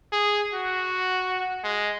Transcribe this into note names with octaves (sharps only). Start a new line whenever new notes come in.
G#4
F#4
G#3